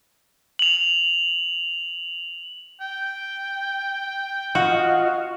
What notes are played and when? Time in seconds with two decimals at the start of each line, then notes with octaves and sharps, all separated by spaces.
0.59 F7 F#7
2.81 G5
4.55 F4 F#4 D#5 F5